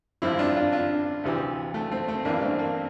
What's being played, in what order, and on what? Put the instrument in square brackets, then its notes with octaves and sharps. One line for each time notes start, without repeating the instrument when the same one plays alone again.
[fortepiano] A1 G2 D3 F3 C4 E4
D4 F4
D4 F4
D4 F4
D2 C3 E3
A3
A3 C4
A3 C4
A1 G2 E3 A#3 D4
A3 C4
A#3